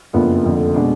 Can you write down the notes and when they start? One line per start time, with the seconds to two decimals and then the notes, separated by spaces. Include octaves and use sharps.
0.13 F#1 F2 F3 B3 D4
0.44 F1 F2 D3
0.74 B2 G#3 D4